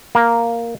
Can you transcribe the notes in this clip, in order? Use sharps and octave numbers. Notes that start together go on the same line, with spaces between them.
A#3